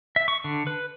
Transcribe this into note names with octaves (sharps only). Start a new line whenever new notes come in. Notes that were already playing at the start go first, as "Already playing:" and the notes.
E5
C#6
D3
B4